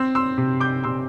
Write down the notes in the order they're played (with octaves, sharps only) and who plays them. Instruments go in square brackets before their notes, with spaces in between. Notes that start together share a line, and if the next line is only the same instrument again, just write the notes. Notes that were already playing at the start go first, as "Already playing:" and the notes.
Already playing: [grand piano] C4 C6 E6
C6 E6
C3
D6 G6
C3 C6 E6